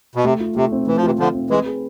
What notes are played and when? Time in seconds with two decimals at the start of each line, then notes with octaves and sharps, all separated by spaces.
0.15 B2
0.24 C3 A3
0.40 F4
0.56 C3 A3
0.72 C4
0.87 E3 A3
0.97 F3
1.03 C3 E3 F4
1.19 D3 F3 A3
1.35 C4
1.50 E3 G#3 B4
1.66 G#4